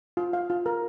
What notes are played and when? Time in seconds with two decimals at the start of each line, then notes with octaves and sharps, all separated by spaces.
0.17 F4
0.33 F5
0.50 F4
0.66 A#4